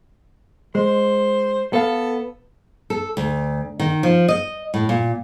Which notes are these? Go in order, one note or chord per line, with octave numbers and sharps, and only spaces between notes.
G#3 C5
B3 A4 F5
A4
D2
D#3
F3
D#5
A2
A#2